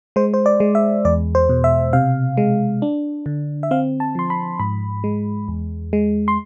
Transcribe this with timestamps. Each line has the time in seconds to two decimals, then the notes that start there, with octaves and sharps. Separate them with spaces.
0.16 G#3 C5
0.34 C5
0.46 D5
0.60 G#3
0.75 E5
1.05 E2 D5
1.35 C5
1.49 B2
1.64 E5
1.93 C3 F5
2.37 G#3
2.82 D4
3.26 D3
3.63 E5
3.71 C4 F5
4.00 A5
4.15 F3 C6
4.30 B5
4.60 G#2 B5
5.04 G#3
5.48 E2
5.93 G#3
6.28 C6